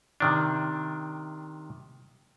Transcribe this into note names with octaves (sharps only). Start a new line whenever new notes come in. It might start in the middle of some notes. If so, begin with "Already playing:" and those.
C3 D#3 D4